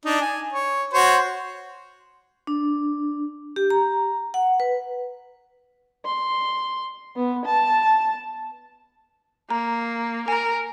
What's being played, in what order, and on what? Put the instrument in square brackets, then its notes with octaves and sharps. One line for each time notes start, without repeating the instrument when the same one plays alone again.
[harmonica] D4 D#4
G#5
C#5
F#4 C5 C#5
[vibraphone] D4
G4
A#5
F#5
B4
[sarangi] C6
B3
A5
[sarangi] A#3 [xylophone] A#5
[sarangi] A#4 [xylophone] G#5 A#5